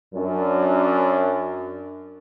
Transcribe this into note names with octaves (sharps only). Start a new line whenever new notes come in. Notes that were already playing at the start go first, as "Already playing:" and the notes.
F#2 D4